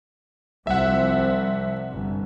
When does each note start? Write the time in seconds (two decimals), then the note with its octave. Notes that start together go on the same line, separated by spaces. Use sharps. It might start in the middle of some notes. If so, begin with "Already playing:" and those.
0.67 C2 F3 E5 F#5
1.92 G1